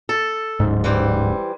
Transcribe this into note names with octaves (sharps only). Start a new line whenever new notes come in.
A4
D1 G#2
E3 G3 C5